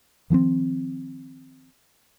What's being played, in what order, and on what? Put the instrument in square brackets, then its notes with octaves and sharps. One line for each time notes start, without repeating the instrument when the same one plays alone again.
[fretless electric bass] D#3 F3 B3 C4